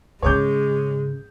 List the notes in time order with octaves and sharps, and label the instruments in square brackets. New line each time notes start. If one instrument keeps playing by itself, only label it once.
[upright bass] G#2 C#3 [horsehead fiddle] G#3 [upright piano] C#5 D6 G6